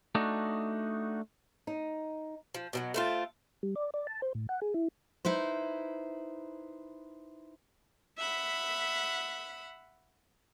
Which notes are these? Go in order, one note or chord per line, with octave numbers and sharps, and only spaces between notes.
A3 D4 D#4 F#4
D#4
F3
B2 F3 F#3
A3 C4 F4
G3
D5
D5
A5
C5
A2
F#5
G#4
E4
D#4 E4 B4 C5
E5 F#5 B5